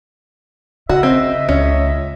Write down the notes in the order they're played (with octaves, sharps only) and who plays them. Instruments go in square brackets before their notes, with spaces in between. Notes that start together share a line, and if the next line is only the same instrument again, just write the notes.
[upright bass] C#3 [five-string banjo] F#4 [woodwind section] D#5 E5
[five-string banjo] C4
[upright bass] C#2 [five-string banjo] C#4